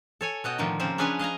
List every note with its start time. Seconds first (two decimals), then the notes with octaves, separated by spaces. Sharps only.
0.21 A4 C#5 G#5
0.44 B2 F#4 D#5 G5
0.58 A2 D3 D#3 F3 A#3
0.80 C#3 F3 A#3 C4 C5
0.98 C#4 D4 G#4 B4 C#5 G#5
1.19 D#5 F5 G#5 A#5